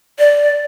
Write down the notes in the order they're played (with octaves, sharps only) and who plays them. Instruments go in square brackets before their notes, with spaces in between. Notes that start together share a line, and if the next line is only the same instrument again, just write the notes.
[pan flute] D5